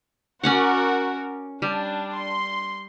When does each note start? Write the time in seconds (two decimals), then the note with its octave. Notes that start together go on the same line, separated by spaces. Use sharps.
0.43 C#4 F#4 A#4 D5 F#5
1.62 G3 D4
2.15 C6